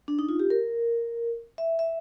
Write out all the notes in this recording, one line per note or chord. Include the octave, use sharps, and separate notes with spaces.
D4
D#4
F4
G4
A#4
E5
E5